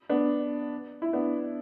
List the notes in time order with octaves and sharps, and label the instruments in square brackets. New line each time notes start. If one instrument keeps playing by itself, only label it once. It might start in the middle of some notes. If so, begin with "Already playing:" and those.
[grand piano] B3 D4
E4
B3 D4